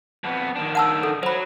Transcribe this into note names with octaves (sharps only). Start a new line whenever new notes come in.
F2 B3
D#3 D4
F#5 A5 E6
A4
F#3 C5 B5